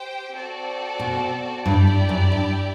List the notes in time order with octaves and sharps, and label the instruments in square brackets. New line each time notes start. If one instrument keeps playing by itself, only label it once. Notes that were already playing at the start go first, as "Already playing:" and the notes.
Already playing: [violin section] G4 C5 G5
C4 F#4 A4 D5
[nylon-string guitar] B2
[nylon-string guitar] G2 [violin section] E4 G4 D5 G5
[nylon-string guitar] G2
F#2
G2